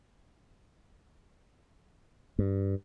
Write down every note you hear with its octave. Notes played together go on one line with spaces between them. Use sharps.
G2